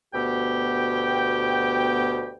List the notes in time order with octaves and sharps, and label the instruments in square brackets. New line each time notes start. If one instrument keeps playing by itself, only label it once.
[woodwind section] D2 B2 B3 G4 G5